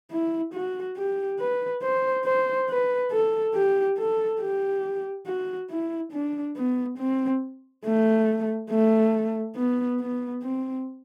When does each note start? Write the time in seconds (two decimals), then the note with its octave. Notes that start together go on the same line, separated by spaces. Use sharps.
0.11 E4
0.53 F#4
0.97 G4
1.39 B4
1.82 C5
2.25 C5
2.69 B4
3.12 A4
3.54 G4
3.98 A4
4.40 G4
5.26 F#4
5.70 E4
6.12 D4
6.56 B3
6.98 C4
7.85 A3
8.70 A3
9.56 B3
10.00 B3
10.43 C4